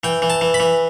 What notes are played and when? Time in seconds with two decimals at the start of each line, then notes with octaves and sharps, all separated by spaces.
0.04 E3 G5
0.22 E3
0.30 A5
0.41 E3
0.54 B5
0.60 E3